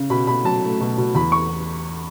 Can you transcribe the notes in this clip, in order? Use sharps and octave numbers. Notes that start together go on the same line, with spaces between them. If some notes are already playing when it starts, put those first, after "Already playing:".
Already playing: C#3
B2 B5
B2 B5
F#3 A5
A3
B2
B2
E2 B5
C#6